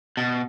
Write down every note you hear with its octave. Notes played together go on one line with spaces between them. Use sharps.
B2